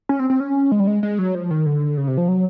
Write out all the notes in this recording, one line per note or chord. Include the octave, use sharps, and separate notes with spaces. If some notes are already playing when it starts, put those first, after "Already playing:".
C#4
C4
C4
C#4
G#3
G3
G#3
G#3
F#3
F3
D#3
D3
C#3
C3
F3
F#3